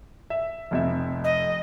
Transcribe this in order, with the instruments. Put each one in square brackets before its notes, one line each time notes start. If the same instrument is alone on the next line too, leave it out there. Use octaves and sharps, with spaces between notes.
[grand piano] E5
F1 F2 E5
[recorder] D#5